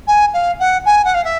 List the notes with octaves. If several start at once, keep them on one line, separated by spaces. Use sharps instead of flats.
G#5
F5
F#5
G#5
F#5
F5
E5